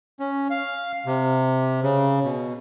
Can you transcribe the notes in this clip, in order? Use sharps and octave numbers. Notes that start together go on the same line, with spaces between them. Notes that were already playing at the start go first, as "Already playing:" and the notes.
C#4
F5
C3
C#3
B2